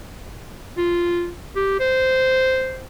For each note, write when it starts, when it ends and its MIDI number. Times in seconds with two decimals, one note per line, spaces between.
0.78 1.31 65
1.56 1.78 67
1.79 2.86 72